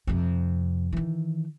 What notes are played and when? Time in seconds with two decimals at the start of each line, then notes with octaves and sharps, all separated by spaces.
0.07 F2 C3
0.92 D#3 E3